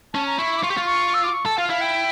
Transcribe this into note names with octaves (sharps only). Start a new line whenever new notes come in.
C#4 A5
A#5
E4 C#6
D6
F4 C#6
G4
F4
C#6
E6
D6
C#6
A4 A5
F4 F5
E4 F5
G5